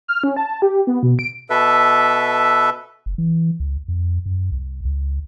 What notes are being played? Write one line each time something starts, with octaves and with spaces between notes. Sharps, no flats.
F6
C#4
A5
G4
B3
B2
D7
B2 A4 B4 E5
F#1
E3
C#2
F2
F#2
C2
C#2